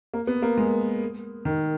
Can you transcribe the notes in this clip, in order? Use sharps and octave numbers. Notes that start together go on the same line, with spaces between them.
A#3
B3
A#3
G#3
D#3